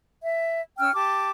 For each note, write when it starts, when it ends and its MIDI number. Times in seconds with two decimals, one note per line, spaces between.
0.23 0.60 76
0.79 0.92 61
0.79 0.92 79
0.79 0.92 88
0.79 0.92 89
0.94 1.31 67
0.94 1.31 81
0.94 1.31 86